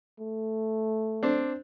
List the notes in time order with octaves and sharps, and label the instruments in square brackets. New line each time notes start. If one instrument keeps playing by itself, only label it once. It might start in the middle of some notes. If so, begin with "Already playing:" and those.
[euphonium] A3
[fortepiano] C4 D4